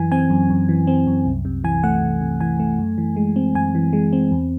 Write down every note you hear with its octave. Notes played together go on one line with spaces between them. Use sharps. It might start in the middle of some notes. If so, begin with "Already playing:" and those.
Already playing: F#2 E3 G#5
C4 G#5
F#2
F#2
E3
C4
F#2
C2
C3
E3 G#5
A3 F#5
C2
C3
E3 G#5
A3
F#2
E3
G#3
C4
F#2 G#5
E3
G#3
C4
E2